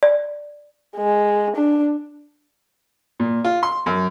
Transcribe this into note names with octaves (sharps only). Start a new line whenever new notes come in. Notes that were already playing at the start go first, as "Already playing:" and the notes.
D5
G#3
D4
A#2
F4
C6
F#2